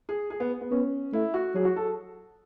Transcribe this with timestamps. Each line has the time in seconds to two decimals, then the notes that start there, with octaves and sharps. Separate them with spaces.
0.09 G#4
0.30 G#4
0.40 B3
0.61 B3
0.71 B3 C#4
1.13 A3 E4
1.34 F#4
1.55 F#3 G#4
1.65 F#4
1.76 A4